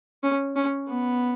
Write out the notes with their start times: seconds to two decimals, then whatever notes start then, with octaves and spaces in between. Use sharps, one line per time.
0.23 C#4
0.56 C#4
0.88 B3